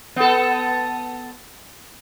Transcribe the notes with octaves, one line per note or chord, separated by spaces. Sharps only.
B3 A4